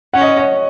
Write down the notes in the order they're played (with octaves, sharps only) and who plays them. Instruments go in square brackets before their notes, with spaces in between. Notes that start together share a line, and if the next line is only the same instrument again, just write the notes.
[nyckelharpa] C#4 [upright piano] F#5
[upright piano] D#5
C#5
D#5